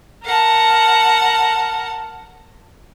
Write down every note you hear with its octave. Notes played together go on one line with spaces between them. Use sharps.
A#4 F#5 A5